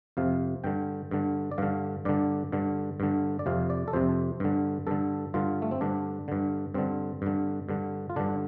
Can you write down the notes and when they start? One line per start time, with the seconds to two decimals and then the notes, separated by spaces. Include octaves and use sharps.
0.17 F2 C3 F5
0.64 G2 D3 G5
1.11 G2 D3
1.51 D5
1.58 G2 D3 F5
2.05 G2 D3 D5
2.52 G2 D3
3.00 G2 D3
3.39 D5
3.46 F2 C3 F5
3.70 D5
3.88 A4
3.93 F2 C3 C5
4.40 G2 D3
4.87 G2 D3 A4
5.34 G2 D3 F4
5.62 A3
5.71 C4
5.81 G2 D3 D4
6.28 G2 D3
6.74 G2 D3 C4
7.22 G2 D3
7.69 G2 D3
8.10 F4
8.16 G2 D3 D4